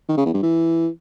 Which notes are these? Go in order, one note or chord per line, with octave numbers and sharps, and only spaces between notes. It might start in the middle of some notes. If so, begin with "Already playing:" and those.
D#3
C#3
E2
G2
E3